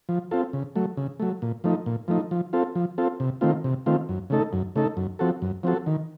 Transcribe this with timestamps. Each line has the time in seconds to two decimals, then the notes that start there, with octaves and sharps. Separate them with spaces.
0.09 F3
0.31 C4 F4 A4
0.53 C#3
0.76 F#3 A3
0.97 C#3
1.20 F#3 A3
1.42 A#2
1.64 F3 A3 D#4
1.86 A#2
2.08 F3 A3 D#4
2.31 F3
2.53 C4 F4 A4
2.75 F3
2.98 C4 F4 A4
3.20 C3
3.41 D#3 A3 C4 F4
3.64 C3
3.86 D#3 A3 C4 F4
4.09 F#2
4.30 C#3 A3 D#4 A4
4.53 F#2
4.76 C#3 A3 D#4 A4
4.97 F#2
5.19 F3 C4 F#4 A4
5.42 F#2
5.63 F3 C4 F#4 A4
5.86 D#3